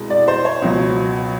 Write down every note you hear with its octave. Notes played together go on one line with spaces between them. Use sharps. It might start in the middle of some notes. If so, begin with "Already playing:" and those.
Already playing: C2 B2 G#3
D5
C5
C#5
C#2 B2 F#3